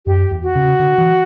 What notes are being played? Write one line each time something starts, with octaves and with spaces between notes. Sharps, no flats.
F#2 G4
E2
F#4
C#3
D3
E3